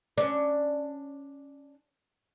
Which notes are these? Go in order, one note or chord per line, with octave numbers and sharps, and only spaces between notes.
C#4 D4